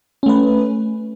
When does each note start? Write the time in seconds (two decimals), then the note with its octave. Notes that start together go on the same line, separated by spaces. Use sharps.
0.23 C#4
0.26 A3
0.29 B4